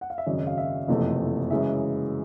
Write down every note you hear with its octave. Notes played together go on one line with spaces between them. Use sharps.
F#5
F5
E5
G#1 F#2 C#3 D#5
F5
E5
F#1 F2 C3 E3 A3 D#5
F#2 C#3 E3 G#3 E5